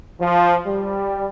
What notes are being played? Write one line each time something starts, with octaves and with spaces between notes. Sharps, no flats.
F3
G3